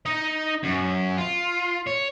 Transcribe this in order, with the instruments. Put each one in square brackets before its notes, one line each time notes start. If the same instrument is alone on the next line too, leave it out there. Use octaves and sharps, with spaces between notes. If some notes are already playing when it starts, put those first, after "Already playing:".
[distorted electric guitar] D#4 D#5
F#2
F4
C#5